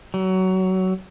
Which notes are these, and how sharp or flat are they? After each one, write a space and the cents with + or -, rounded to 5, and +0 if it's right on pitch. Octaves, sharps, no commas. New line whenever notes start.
F#3 +20